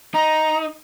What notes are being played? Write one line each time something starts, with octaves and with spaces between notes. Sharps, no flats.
D#4 A#5